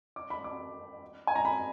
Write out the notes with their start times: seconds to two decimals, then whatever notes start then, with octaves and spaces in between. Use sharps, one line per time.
0.16 D6
0.30 B5
0.44 D6
1.27 G#5
1.35 A#5
1.45 B5